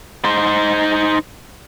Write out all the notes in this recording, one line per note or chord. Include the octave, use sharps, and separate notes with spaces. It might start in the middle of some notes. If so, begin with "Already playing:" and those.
D#4 C5